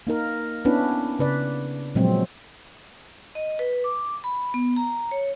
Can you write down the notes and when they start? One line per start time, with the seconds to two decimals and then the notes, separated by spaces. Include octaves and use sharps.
0.07 A#3 D#4 A#4
0.65 B3 C#4 D4 E4 B4
1.19 C#3 B4 D5
1.95 A#2 F3 F#3 G#3 C4
3.35 D#5
3.59 B4
3.84 D6
4.24 B5
4.54 B3
4.76 A#5
5.11 C#5